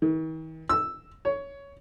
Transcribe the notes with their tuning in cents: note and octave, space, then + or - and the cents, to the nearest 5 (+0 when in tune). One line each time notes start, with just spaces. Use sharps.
D#3 +45
E6 +0
C#5 +10